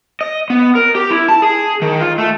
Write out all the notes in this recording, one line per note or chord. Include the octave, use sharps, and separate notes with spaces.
D#5
B3
A#4
G4
E4
A5
G#4
D#3
F4
A3